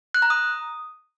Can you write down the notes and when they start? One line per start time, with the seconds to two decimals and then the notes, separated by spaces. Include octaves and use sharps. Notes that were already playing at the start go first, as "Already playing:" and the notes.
0.14 F#6
0.22 A#5
0.30 D#6